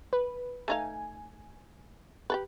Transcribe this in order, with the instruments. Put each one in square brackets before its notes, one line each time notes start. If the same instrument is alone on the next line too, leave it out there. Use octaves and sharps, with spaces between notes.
[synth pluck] B4
[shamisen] A3 D#4 F5 [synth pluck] G#5
[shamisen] G4 A4 B4